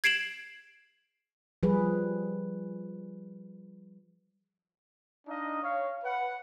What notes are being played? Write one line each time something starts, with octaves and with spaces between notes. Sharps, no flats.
G#6 C7 D7 E7 F#7
F3 G3 G#4 B4
D4 D#4 D#5 F5
C#5 F5
B4 F#5